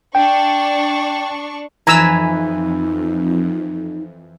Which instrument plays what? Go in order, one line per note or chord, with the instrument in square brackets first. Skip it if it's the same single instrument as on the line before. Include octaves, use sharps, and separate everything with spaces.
[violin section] D4 C#6 [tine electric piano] G5
[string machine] F2 [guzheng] E3 B4 G#5 [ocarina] D#4 [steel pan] A#5 E6